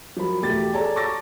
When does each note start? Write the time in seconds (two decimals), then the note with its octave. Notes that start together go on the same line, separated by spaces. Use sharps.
0.16 F3 F#3 A#4 B5
0.41 E2 B2 A3 G4 A6
0.73 G#4 A4 C#5 D5 A5 A#5
0.96 A5 C#6 D6 E6 A6 A#6